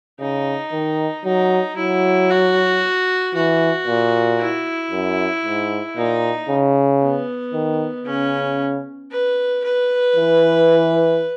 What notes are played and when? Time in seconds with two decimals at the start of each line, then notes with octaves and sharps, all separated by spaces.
0.20 C#3 D#4
0.73 D#3
1.25 F#3 D#4
1.77 F#3 E4
2.30 F#4
3.35 E3 F#4
3.87 A#2
4.39 E4
4.91 F#2
5.44 G#2
5.97 A#2 D#4
6.49 C#3
7.02 B3
7.54 D#3
8.06 C#3 C#4
9.11 B4
9.64 B4
10.16 E3